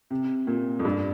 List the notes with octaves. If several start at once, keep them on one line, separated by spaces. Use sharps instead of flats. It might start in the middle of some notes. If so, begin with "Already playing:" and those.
C3
A#2
F2
G2